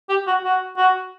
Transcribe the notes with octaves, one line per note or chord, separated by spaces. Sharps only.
G4
F#4
F#4
F#4